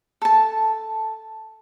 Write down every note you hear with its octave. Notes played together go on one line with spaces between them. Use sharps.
A4 A5